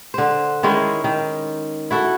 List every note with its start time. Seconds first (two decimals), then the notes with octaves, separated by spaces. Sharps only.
0.14 D3 C5
0.63 D#3 G#3 C#4 E4
1.04 D#3
1.91 E4 F#4 A4